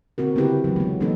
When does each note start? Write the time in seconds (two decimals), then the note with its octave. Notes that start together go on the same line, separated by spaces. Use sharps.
0.18 D3 C4 F#4 A#4
0.35 C#3 B3 C4 E4 G4 B4
0.64 E3 F#3
0.76 G#3 B3
1.01 E3 F#3 A#3 C#4 D#4 A4